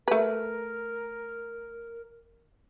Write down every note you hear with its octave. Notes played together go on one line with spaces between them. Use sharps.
A3 A#4 B4